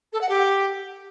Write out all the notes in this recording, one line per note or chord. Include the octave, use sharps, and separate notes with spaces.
A4
F#5
G4